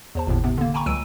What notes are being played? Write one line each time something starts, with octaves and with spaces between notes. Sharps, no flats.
E2 C5 A5
G1 D#2 A2
C3 B3
D3 A#3
G5 G#5 A#5 B5 C#6
C#2 F#3 E6 D7 D#7